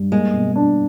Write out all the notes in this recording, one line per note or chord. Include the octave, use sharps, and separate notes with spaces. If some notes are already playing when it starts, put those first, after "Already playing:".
Already playing: G2
G#3 A#3
B2
D4